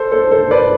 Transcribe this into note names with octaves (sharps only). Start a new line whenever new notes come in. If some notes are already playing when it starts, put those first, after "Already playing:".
Already playing: A4 C5
A4 C5
A4 C5
B4 D5